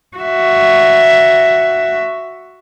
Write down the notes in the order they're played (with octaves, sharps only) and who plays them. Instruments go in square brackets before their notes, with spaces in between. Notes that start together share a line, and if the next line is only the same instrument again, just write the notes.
[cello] F#4 E5